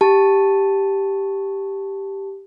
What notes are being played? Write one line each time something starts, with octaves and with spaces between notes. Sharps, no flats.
G4 A5